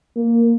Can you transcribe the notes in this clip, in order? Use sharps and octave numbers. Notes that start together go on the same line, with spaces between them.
A#3